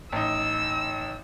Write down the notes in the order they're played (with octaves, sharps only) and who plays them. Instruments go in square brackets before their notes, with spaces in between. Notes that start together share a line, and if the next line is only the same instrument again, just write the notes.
[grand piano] A1 D#4 [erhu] E6